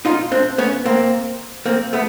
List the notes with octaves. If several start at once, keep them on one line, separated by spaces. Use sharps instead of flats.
D#4 F4
C4 D4
B3 C#4
A#3 C4
A#3 C4
A3 B3